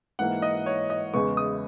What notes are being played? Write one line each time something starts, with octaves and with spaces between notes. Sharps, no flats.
G#2 E3 A#3 F#5
D#5
C#5
D#5
E2 C#3 G#3 B3 C#6
D#6